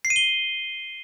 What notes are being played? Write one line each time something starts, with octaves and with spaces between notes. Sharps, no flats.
C7
D#7
G7